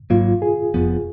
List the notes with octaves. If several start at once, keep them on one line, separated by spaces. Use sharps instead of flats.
G#1 G#2 F#3 A#3 F4
G#4
F1 F2 F3 B3